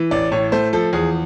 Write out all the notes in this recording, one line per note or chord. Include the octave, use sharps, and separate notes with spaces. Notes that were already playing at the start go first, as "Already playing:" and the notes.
Already playing: E3
A1 D5
A2 C#5
A3 C5
F3 A4
E2 G#4